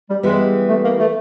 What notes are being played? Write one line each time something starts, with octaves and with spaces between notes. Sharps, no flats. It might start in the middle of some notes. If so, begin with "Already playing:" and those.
G3
E3 G3 G#3 B3 E4 G4
A3
A#3
A3